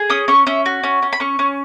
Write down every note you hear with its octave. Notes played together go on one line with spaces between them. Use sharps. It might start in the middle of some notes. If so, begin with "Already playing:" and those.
Already playing: G#4
C#4 D#6
C#4 C#6
C#4 E5
F#4
C#4
C#4
B5
C#4 C#6
C#4